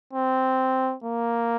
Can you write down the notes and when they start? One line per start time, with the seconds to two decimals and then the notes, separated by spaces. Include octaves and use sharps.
0.13 C4
1.04 A#3